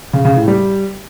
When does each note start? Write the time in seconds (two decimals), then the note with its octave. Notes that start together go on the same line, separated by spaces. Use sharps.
0.13 C#3
0.25 C#3
0.36 A2
0.48 G3